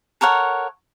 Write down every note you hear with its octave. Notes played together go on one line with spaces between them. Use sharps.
A4 A#4 C#5 F#5